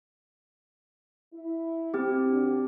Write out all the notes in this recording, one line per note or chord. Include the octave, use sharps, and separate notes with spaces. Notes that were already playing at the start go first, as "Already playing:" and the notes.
E4
C4 G4
D#2 D4 F#4